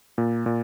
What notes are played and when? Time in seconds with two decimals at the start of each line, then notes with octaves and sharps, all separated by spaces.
0.18 A#2
0.46 A#2